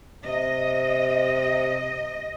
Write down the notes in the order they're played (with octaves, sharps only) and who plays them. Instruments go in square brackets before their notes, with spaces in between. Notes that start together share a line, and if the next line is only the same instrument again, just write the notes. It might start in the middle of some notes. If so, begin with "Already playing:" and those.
[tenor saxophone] C3 [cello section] D#5